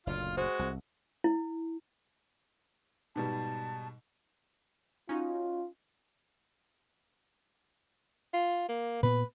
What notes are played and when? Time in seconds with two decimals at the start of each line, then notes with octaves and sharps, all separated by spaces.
0.07 F#1 D2 A#2 F4 F5
0.37 G#3 F#4 C5
0.59 C2
1.24 E4
3.16 G#2 B2 G3 A5
5.09 C#4 D#4 F4 F#4
8.33 F4
8.69 A#3
9.03 A#2 B3 B4